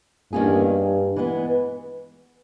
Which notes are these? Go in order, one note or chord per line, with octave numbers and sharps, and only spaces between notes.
E2 G2 D#3 A#3 C#4 G#4
E3 G#3 B3